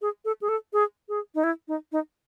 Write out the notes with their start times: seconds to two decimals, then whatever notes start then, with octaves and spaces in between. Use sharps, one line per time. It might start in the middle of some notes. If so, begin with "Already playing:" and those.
0.02 G#4
0.25 A4
0.41 G#4
0.49 A4
0.73 G#4
1.09 G#4
1.35 D#4
1.44 E4
1.68 D#4
1.92 D#4